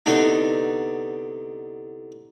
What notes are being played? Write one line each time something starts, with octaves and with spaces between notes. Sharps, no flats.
C2 D3 B3 D4 D#4